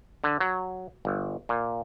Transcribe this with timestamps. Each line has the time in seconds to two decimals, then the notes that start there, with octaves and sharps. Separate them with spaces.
0.24 D3
0.40 F#3
1.05 G1
1.49 A#2